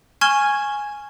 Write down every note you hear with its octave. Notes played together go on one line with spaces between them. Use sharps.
G#5 C#6 F6 G#6 E7 G7